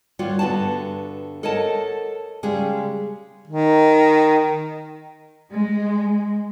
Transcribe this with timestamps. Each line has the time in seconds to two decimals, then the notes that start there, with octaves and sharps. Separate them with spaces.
0.19 D#2 G3 F4 F#4 C#5
0.39 G2 D3 B3 F#4 A5
1.43 A4 A#4 C#5 D#5 F#5 A5
2.43 C#3 G3 G#3 G4 G#4
3.47 D#3
5.52 G#3